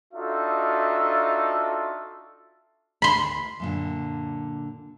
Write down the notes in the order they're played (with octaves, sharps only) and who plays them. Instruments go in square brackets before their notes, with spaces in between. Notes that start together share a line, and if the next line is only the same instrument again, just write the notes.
[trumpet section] D4 D#4 F4 F#4 A4 E5
[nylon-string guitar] D2 [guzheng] B5 C6
[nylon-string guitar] F#2 A#2 D3